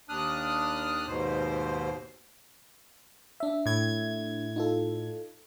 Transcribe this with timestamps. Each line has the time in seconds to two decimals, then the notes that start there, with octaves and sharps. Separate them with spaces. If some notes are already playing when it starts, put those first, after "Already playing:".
0.09 D#2 D4 D#6 F6 F#6
1.07 D#2 G#2 B2 C5
3.40 D4 E5
3.66 A2 G#6
4.56 D#4 F4 A4